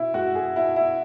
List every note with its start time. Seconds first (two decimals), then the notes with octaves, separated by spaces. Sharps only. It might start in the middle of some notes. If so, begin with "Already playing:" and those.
Already playing: B2 E4
0.14 G#3 F#4
0.35 G#4
0.56 B2 E4
0.76 E4